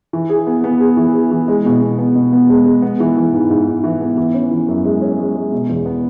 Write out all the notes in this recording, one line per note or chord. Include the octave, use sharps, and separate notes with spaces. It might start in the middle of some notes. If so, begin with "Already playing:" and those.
E3
G#4
B3
B3
G#4
E3
G#4
E3
G#3
B2
B2
B3
B2
B3
G#3
G#3
B3
E3
E3
G#2
G#2
G#2
E3
B3
E3
C#4
E3
F#2
G#3
C#4
G#3
G#3
B2
E2
B3